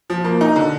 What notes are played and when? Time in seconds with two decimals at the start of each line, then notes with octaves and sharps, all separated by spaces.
0.10 F3
0.24 A#3
0.41 D#4
0.56 D3